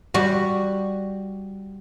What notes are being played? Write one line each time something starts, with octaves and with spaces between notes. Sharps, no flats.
G3 F#4